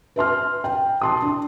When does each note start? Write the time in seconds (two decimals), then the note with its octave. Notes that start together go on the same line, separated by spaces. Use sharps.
0.16 B4 E5 C6 F6
0.64 G5
1.02 A5 C6 D#6
1.22 D4